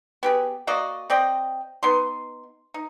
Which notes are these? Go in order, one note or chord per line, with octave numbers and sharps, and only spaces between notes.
B3 G4 G#4
A#3 F#4 D5 D#5
C4 D5 D#5 G5
B3 D#4 C6
D#4